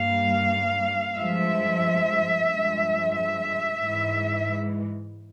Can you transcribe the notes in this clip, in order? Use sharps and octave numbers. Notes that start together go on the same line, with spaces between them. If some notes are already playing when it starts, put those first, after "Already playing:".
Already playing: G2 G3 A#3 F5
G2 F3 G#3 E5
G2 F3 G#3
E5
G#2 E3 G#3